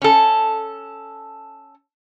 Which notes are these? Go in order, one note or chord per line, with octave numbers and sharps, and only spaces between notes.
C#4 A4